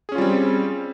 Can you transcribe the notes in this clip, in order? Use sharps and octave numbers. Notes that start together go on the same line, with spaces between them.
G3 C4 C#4 F4 G#4